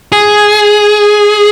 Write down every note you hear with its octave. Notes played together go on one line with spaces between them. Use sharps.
G#4